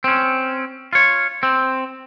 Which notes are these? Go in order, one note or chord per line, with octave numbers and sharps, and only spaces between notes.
C4 C#4
F4 C#5
C4